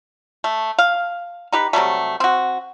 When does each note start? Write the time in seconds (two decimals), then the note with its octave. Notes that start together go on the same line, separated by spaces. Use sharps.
0.44 A3
0.79 F5
1.52 D#4 G4 B4
1.73 C3 F#3 G3 A3
2.20 C4 F#4